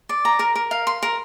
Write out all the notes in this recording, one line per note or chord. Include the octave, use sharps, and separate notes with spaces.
D5
A#5
A#4
A#4
F5
C6
A#4